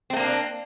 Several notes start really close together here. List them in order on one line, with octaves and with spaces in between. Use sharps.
C4 A3 A#3 D4